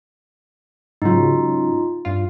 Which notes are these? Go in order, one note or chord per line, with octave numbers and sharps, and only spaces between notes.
G#2 C#3 F#3 D#4 F4
G2 F4